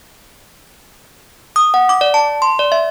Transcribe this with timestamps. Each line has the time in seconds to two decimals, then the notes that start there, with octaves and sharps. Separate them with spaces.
1.56 D#6
1.74 F#5
1.89 D6
2.01 D5
2.14 A5
2.42 C6
2.59 D5
2.72 E5